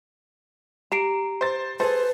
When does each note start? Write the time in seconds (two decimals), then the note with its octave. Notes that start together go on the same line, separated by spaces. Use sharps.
0.92 G4 A#5 C7 D7
1.41 C5 A6
1.80 G#4 A4 B4 C5